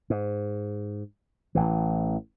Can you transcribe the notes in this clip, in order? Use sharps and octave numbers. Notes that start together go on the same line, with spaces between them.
G#2
A1 E3